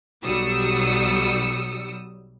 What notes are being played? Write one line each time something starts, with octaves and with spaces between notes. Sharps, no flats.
B1 F#3 G3 D#6 E6 C#7